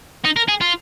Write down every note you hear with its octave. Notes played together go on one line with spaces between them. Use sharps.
D#4
A#4
G#4
F4